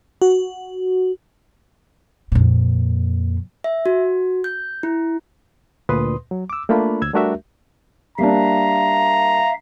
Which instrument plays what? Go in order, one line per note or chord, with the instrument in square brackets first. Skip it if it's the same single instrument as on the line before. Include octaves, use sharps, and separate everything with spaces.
[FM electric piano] F#4
[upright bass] F2 A#2
[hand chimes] E5
F#4
G6
E4
[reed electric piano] D2 A#2 B4 C6 D#6
F#3
D6 E6
A3 A#3 D4 F4 B5
D2 E6 G#6
G3 A3 D4 F#4 A#4 E5
[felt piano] G3 A#3 D4 [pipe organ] E5 F5 [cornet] A#5